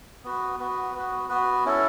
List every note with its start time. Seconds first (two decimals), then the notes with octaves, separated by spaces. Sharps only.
0.24 B3 F#4 B4
0.60 B3 F#4 B4
0.94 B3 F#4 B4
1.29 B3 F#4 B4
1.65 C#4 E4 A4